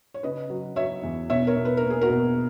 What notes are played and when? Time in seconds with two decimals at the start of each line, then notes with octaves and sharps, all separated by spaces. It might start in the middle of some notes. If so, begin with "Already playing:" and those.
0.14 C#5
0.23 C#3 B4 D#5
0.50 F#3
0.76 F#3 C#5 E5
1.03 E2
1.30 B2 C#5 E5
1.47 A#4 C#5
1.56 B2
1.65 B4
1.77 A#4
1.83 A#3
1.90 G#4
2.01 F#4 A#4
2.09 B2